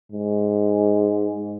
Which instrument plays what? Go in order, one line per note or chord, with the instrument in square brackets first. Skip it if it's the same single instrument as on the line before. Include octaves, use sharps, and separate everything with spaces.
[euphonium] G#2